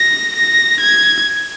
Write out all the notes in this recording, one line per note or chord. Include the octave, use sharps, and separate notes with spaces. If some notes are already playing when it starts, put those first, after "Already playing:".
Already playing: A#6
A#6
G#6